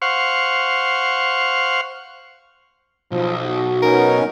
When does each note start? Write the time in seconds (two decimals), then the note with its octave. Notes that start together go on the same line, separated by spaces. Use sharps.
0.02 C5 F5 F#5 C#6
3.12 B1 F3
3.45 F#4
3.82 B3 C#4 D#4 A#4